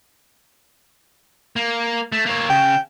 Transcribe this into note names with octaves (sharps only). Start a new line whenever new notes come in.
A#3
A3
A#3 C#5
C#3 G5